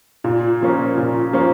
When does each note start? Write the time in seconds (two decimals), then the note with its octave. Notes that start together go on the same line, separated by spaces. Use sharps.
0.24 A#2
0.61 F3 A#3 C#4
0.98 A#2
1.33 F3 A#3 C#4